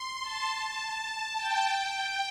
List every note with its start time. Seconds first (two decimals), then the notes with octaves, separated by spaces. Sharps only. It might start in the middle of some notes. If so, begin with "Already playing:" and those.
Already playing: C6
0.21 A5
0.79 A5
1.36 G5
1.94 G5